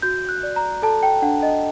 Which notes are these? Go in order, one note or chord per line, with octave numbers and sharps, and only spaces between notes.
F#4 G6
F#6
D5
A#5
A4 A5
G5
D4 F#5
D#5